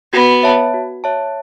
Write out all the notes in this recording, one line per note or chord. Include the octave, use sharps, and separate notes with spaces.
B3 F#4
C#5 E5 A5
F#4
C#5 E5 A5